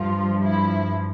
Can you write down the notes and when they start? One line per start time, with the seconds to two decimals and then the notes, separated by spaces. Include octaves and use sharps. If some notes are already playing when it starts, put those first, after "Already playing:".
Already playing: G2 F3 F4
0.42 E4